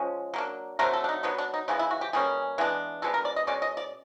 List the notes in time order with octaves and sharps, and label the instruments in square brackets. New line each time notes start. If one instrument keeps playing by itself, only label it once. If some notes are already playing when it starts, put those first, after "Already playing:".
Already playing: [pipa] F3 G#3 C#4
F#3 A#3 D4
D3 F#3 A3 C4 A#4
A4
D4
D#4
F#3 B3 D4 D#4
D4
D#4
C#3 E3 G#3 B3 D#4
E4
F#4
G4
B2 G3 A#3 C#4 G#4
E3 G#3 B3 D4
B2 G#3 B3 D4 A4
A#4
D5
D#5
B2 G#3 C#4 D5
D#5
D5